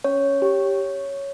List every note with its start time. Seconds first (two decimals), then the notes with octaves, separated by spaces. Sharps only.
0.04 C#4 C#5
0.42 G4